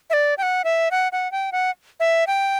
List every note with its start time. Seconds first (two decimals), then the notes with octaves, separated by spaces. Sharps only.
0.10 E5
0.13 D5
0.38 G5
0.43 F#5
0.64 E5
0.91 F#5
1.12 F#5
1.32 G5
1.52 F#5
2.00 E5
2.27 G5